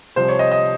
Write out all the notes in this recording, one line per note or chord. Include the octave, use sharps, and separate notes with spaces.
C2 C3 F3 C5
C#5
D#5
D#5